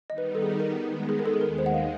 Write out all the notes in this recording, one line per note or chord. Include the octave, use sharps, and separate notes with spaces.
D#3 G3 B3 D#4 D#5
B4
A4
G#4
A#4
D#3 G#3 B3
G#4
A#4
A4
G#4
D#2 D#3 G#3 A#4
C5
F#5
F5